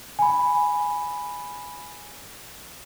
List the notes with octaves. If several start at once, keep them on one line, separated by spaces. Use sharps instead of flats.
G#5 B5